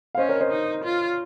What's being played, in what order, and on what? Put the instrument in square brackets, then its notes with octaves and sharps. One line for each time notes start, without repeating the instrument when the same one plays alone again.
[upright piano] F5
[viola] C#4 [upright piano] C5 D#5
[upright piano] A#4 C#5
C5 D#5
[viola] D#4
F4